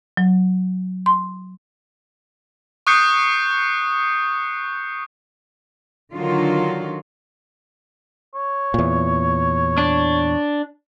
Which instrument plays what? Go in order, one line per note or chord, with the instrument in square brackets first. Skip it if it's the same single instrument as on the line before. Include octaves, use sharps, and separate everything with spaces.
[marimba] F#3
C6
[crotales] C#6 D#6 F#6 G6 C7 C#7
[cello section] D3 D#3 F#3 F4
[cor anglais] C#5
[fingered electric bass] E2 A#2
[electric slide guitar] D4